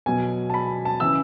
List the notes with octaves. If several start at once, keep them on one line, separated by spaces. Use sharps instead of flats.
B2 F#3 G#5
A5
B5
A5
C#3 E3 E6